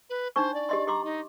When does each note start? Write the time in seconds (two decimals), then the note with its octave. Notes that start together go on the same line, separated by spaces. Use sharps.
0.09 B4
0.36 D4 D#4 C5 C#6
0.54 D5
0.69 G4 D#5 C6
0.87 G4 A#5 C6 D6
1.04 D#4